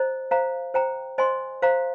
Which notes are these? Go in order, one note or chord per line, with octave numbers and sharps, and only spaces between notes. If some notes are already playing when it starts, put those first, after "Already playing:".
Already playing: C5 D#5 A#5
C5 F5 A#5
C5 G5 A#5
C5 D#5 G#5 C6
C5 F5 A#5